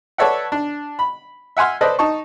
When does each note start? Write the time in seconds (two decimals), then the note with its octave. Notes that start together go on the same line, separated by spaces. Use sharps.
0.18 A4 B4 C#5 D5 E5 F#5
0.52 D4
0.99 B5
1.57 E5 F#5 G#5 C6 F6
1.81 A4 B4 C5 D5 D#5
1.99 D#4 A5 C#6